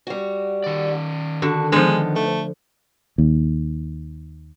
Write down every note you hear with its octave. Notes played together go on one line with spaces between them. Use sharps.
G3 F#4
D#3 D5
D3 F#4 A5
D3 F3 G#3 B3 D#4 A4
A3
D#2